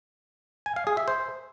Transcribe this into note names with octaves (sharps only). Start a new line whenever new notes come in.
G#5
F5
G#4
E5
C5